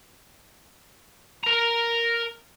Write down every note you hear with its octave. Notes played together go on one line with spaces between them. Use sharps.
A#4 A#5